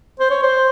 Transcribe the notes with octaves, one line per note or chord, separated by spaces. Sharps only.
C5
C#5
C5